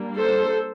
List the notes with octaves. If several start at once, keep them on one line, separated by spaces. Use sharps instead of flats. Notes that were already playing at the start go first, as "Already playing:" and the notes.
Already playing: G3 A#3 D4
A4 C5